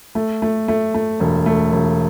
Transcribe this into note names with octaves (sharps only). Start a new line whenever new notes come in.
A3
A3
A3
A3
E1
A3
E1